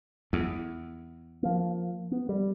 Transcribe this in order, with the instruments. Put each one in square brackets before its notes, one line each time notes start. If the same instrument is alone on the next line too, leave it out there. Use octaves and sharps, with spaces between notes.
[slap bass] E2
[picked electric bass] F3 A#3
B3
G3